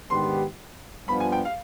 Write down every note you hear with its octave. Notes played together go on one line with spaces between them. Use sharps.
G#2 D#3 B3 D4 G4 C6
G2 F3 B3 D4 F4 B5
G#5
G5
F5